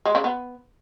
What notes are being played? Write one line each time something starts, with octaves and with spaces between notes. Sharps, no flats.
G#3
C#3
B3